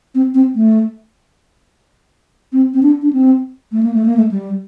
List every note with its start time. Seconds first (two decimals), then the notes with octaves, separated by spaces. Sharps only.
0.15 C4
0.34 C4
0.55 A3
2.53 C4
2.74 C4
2.83 D4
3.02 D4
3.13 C4
3.72 A3
3.83 A#3
3.94 A3
4.06 A#3
4.17 A3
4.31 G3